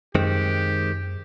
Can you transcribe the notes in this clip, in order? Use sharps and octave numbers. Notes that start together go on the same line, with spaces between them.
F#2 D#3 G#3 C4 G4